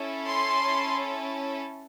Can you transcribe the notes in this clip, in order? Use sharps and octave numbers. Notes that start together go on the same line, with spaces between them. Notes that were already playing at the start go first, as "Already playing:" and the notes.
Already playing: C#4 E4 A4
C6